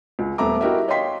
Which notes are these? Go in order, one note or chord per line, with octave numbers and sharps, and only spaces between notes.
C#2
D#1 A3 B3 E5 A#5 D6
E4 F#4 G4 A#4 D#5 E5
C#5 D#5 F5 G5 C6 B6